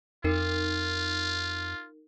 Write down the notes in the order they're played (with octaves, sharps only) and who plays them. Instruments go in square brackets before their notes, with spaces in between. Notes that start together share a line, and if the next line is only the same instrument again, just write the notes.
[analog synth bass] F2 [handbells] D#4 A#4 C7 [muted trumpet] F4